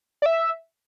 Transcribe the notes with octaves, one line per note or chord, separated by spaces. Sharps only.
D5
E5